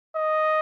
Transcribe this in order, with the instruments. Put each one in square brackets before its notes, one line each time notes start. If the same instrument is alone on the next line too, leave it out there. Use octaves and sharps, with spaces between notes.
[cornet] D#5